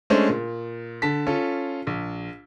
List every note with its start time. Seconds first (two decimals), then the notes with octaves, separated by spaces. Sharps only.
0.10 G#3 A3 C#4 D4 C5
0.29 A#2
1.02 D3 A5 B6
1.27 C#4 F4 A4
1.87 A#1